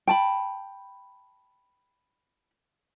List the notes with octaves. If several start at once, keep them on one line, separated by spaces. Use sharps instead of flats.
G5 A5 B5